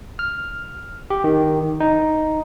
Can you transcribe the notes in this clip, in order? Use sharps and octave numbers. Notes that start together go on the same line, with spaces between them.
F6
G4
D#3
D#4